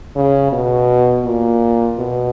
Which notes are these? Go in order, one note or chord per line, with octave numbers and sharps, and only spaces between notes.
C#3
B2
A#2
B2